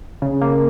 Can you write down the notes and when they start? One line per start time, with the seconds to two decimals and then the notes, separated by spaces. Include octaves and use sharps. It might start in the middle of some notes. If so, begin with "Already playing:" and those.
0.22 C#3
0.41 A#3